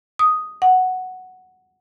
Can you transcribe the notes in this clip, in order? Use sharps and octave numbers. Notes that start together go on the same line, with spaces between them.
D#6
F#5